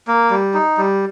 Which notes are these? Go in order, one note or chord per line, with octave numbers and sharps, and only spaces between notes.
A#3
G3
D#4
G3